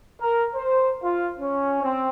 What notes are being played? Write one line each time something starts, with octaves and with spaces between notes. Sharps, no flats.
A#4
C5
F4
C#4
C4